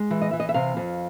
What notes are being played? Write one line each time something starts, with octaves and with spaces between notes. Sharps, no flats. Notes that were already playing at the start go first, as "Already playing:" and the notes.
Already playing: G#3
E3
D#5
E3 E5
D#5
E5
C3 F5
F2